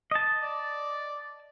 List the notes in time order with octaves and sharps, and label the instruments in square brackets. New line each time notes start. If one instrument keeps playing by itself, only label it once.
[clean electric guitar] D#5 A5
[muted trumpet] D5